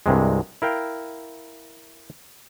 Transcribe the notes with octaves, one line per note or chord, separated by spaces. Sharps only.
C2 G2 C3 G#3
E4 A#4 F5 G5